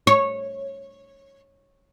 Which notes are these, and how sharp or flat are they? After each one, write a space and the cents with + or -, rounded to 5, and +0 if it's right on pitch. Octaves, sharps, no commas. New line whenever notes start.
C#5 -15